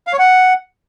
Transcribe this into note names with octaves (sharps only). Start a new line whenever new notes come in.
F5
C#5
F#5